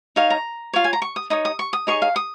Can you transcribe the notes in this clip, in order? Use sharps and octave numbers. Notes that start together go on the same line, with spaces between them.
D#4 C#5 F5
A#5
F4 C#5 F5
G#5
A#5
C#6
D#6
D#4 C#5 D#6
D#6
C#6
D#6
D#4 G#4 C#5 C#6
F5
D#6